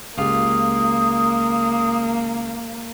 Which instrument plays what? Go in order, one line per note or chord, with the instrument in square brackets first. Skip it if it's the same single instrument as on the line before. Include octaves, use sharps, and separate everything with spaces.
[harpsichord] C#2 F4 G4 [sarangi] A#3 [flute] D#6